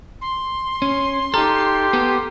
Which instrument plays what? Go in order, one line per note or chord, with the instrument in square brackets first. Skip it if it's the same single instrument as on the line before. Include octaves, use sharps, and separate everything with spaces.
[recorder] C6
[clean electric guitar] C#4
[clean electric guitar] D#4 A4 [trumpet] G4 [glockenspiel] A#5 F6
[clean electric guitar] B3 A4